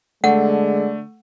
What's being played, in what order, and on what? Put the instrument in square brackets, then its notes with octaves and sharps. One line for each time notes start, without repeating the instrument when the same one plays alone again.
[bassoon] D3 [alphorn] G#3 [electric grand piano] A3 [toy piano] F#5